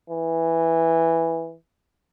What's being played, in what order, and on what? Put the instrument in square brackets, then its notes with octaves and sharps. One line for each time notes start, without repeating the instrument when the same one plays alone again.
[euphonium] E3